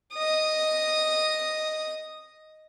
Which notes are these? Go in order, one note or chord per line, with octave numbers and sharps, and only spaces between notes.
D#5 D#6